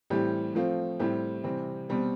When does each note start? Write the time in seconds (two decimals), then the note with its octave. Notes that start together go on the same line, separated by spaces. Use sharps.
0.10 A2 E3 G3 C4 G4
0.55 F3 A3 C4 F4
0.99 A2 G3 C4 E4 G4
1.44 C3 E3 G3 C4
1.89 B2 G3 C4